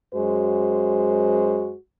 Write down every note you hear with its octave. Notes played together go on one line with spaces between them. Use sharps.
F#2 G#3 F#4 C5